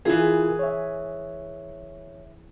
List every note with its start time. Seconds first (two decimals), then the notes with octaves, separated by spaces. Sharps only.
0.05 E3 E4 F4 G#4 A#4
0.59 C#5 E5